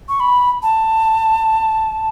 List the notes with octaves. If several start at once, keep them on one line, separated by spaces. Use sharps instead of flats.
C#6
B5
A5